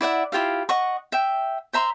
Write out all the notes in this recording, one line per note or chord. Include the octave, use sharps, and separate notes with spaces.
E4 D5 E5 F#5
E4 F4 G4 F5
D#5 F#5 C#6
E5 G5
C5 E5 A#5 C6